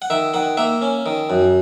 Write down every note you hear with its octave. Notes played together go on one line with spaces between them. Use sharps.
F#5
D#3 E5
D#3 F#5
A#3 E5
C#4
D#3
F#2